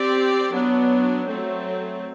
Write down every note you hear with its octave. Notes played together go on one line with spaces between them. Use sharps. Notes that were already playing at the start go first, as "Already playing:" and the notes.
Already playing: C4 G4 D5
F#3 B3 D4
F#3 A3 C4